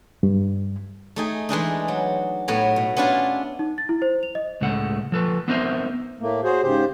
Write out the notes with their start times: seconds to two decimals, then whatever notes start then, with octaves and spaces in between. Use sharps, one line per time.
0.23 G2
1.16 A3 D#4 G#4
1.49 E3 G#3 D4 D#4
1.88 F#3
2.48 A2 B3 C#5 A#5
2.76 B2
2.97 B3 C#4 D4 E4 F4
3.59 D#4
3.78 A6
3.89 E4
4.02 C5
4.23 F7
4.35 D#5
4.61 C#2 A2 G#3 A3 F#5
5.12 F3 A4 B4
5.48 B3 C4 D#4 A#4 C5 E5
6.20 A2 A3 A#3
6.44 F#4 G#4 C5 C#5
6.62 G#2 C#3 G4 C5